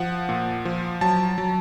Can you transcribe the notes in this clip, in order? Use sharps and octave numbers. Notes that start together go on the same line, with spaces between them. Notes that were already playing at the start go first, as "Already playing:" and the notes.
Already playing: F3 F#5
A#2
F3
F#3 A5
F#3